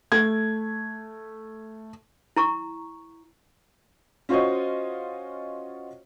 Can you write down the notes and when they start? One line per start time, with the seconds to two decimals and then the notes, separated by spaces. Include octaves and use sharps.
0.12 A3 G#6
2.36 E4 A#5 C#6
4.29 C#4 F4 F#4 C5 C#5 D#5